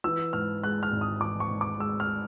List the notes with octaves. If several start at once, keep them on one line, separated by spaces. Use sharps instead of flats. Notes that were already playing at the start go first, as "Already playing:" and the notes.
E3 E6
G#2 F6
G#3 F#6
F6
G#1
D#6
E3 D6
C#6
G#2
D6
G#3 E6
F6